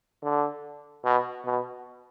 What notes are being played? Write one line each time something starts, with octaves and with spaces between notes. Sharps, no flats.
D3
B2
B2